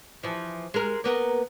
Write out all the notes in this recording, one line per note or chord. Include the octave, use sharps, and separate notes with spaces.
E3 F3
G#3 A#4
A#3 B3 A#4